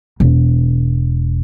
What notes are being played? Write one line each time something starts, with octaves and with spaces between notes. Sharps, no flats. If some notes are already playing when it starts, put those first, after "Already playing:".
E1